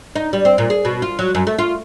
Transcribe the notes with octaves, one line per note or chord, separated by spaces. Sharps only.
D#4
G3
C4
A#2
G#4
B2
F4
F#3
F#2
A3
F4